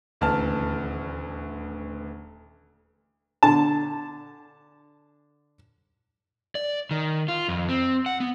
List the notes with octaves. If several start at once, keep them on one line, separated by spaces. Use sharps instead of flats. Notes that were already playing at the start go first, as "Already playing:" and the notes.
D#1 D2 E3 A5 F6
D3 A5
D5
D#3
F4
F2
C4
F#5
B3